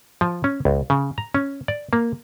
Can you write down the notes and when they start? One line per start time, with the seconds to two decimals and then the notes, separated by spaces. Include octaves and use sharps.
0.21 F3
0.44 C#4
0.65 C#2
0.90 C#3
1.18 A#5
1.34 C#4
1.68 D5
1.93 A#3